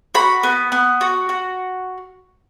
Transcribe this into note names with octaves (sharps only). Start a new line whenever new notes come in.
F#4 B5
B3
B3
F#4
F#4